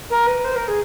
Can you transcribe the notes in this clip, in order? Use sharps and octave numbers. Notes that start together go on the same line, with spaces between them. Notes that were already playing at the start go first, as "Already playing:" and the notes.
A#4
B4
C5
A#4
G#4